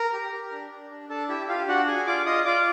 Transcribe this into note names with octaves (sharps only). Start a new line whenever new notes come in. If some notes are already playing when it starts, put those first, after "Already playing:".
Already playing: A#4 A#5
G4
G4
D4
D4
D4
D4 A4 A5
E4 G4 E5
F4 G4 F5
D4 F#4 F#5
G#4 G#5
F4 D5 D6
F4 D#5 D#6
F4 D5 D6